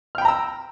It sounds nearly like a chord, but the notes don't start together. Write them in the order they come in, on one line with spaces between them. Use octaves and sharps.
F6 G5 B5 A#5 E6